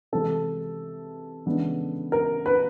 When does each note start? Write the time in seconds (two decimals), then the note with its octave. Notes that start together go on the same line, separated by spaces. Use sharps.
0.12 C3 E3 G#3 A4
1.46 C#3 E3 G#3 B3 D4
2.12 A#4
2.46 B4